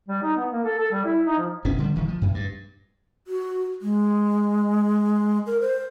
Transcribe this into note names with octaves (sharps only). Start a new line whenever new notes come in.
G3
D#4
B3
A#3
A4
A4
G3
E4
D#4
F3
D#1 B3 C#4
D3 G3
D1 D#3 F3
F3
F#2
G2
F#4
G#3
A#4
C5